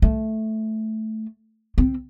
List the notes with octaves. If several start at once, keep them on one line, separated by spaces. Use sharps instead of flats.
A3
C4